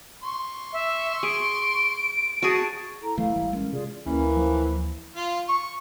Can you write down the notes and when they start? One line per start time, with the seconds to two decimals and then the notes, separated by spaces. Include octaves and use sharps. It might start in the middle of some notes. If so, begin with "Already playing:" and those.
0.23 C6 C#6
0.73 E5
1.23 G#4 D7
2.43 F#4 G#4 A5
3.02 E4 A4 A#5
3.18 E3 A3 E4 F5
3.36 G#1 E3 G3
3.53 G#3 C#4 A#4
3.72 C3 F4 G#4 D5
4.06 D2 E3 A#3 C#4
4.36 F3
5.16 F4
5.49 C#6